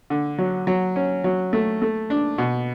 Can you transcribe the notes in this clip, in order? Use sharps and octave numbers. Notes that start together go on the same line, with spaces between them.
D3
F#3
F#3
C#4
F#3
A3
A3
D4
B2